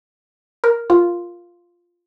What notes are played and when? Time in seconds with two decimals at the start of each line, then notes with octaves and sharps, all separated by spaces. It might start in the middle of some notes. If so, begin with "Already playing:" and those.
0.64 A#4
0.90 F4